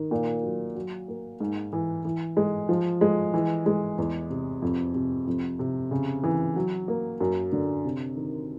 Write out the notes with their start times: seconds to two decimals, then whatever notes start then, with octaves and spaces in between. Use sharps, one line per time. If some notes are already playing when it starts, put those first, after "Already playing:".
Already playing: D#3
0.11 A#2
0.43 F#3
0.75 F#3
1.08 A#3
1.40 G#2
1.73 E3
2.05 E3
2.37 G#3
2.69 F3
3.01 G#3
3.34 E3
3.66 G#3
3.98 E2
4.30 C3
4.62 F2
4.95 C3
5.27 F2
5.59 C3
5.91 C#3
6.23 E3
6.56 F#3
6.88 A#3
7.21 F#2
7.52 D3
7.85 C3
8.17 D#3